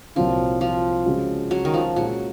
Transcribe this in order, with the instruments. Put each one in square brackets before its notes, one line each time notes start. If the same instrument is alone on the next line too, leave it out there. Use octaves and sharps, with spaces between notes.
[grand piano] C2 A#2 F#3 C4 F4 [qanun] F3
[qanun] F3
[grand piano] C#3 G#3 C#4 F#4
[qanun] F#3
D#3
F3
[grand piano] A#2 G#3 C#4 F#4 [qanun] F#3